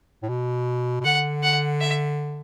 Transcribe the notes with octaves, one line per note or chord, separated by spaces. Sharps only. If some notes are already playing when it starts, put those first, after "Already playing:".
A2
B2
B2
D3 F#5
F#5
E5